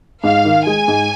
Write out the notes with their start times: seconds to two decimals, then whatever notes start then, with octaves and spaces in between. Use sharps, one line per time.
0.23 G#2 F5
0.45 D#3
0.66 G#3 G#5
0.88 G#2